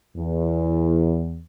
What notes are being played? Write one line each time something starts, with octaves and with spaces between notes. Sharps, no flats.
E2